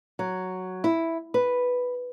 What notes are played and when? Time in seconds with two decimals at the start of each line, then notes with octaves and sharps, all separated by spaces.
0.19 F#3
0.84 E4
1.34 B4